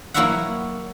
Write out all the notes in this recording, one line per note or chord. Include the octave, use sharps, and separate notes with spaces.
F#3 A#3 E4 C#5 E5 F#5